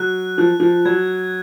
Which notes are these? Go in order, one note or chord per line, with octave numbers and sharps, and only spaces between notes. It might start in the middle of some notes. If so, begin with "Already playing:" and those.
Already playing: F#3 F#6
F3 F#6
F3
F#3 G#6